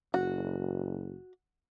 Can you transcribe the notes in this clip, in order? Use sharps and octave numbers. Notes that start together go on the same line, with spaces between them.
F#1 F#4